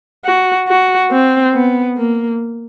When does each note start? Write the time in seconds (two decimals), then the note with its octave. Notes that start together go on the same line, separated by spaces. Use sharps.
0.25 F#4
0.68 F#4
1.11 C4
1.54 B3
1.97 A#3